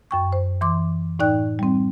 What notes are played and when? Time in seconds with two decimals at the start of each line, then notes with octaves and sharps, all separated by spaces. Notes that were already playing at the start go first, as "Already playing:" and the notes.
0.11 F#2 G5 C#6
0.33 C5
0.61 E3 C6 D6
1.19 A2 D#4 D5 G5 F#6
1.59 G3 C4